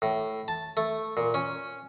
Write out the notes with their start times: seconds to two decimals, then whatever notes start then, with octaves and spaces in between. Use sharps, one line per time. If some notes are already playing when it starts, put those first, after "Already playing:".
0.02 A2
0.48 A5
0.77 A3
1.17 A#2
1.34 C#4